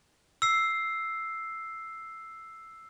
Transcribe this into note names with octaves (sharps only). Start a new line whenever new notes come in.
E6 C7